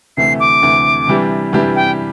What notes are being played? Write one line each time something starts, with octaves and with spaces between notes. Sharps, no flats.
D2 C3 E3 A3 C7
D6
D2 C3 E3 A3
C3 E3 G3 D4 G4
C3 E3 G3 D4 G4
G5